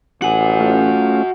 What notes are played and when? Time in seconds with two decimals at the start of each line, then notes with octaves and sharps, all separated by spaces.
0.22 A1 F#4 F#5 G#5
0.60 A3 C#4 F4